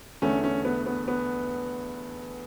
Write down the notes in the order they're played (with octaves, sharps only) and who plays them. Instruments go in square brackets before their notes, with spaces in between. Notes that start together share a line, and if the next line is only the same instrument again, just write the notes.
[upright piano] E2 D3 A3 C#4
C#4
B3
B3
B3